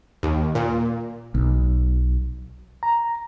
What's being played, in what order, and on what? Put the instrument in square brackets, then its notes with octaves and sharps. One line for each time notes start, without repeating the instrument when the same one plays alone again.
[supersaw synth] D#2
A#2
[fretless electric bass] B1
[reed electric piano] A#5